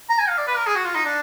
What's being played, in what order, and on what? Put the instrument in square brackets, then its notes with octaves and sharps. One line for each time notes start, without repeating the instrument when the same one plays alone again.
[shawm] A#5
G#5
F5
D5
B4
A#4
G#4
F#4
F4
D#4
D4